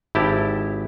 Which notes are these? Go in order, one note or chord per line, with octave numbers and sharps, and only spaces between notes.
G#1 E4 G4 A5